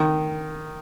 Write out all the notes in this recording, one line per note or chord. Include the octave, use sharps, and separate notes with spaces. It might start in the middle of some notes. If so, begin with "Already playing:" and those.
Already playing: D#3